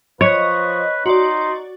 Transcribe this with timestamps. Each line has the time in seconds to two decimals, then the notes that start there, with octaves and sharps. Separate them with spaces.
0.21 F3 B4 C#5 D#5 C#6
1.06 D#4 F#4 D5 C6